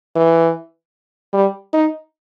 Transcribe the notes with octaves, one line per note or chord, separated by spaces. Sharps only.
E3
G3
D#4